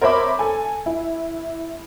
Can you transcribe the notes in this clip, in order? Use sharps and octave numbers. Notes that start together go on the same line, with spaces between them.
A#4 C5 C#5 E5 B5 D6
A4 G#5
E4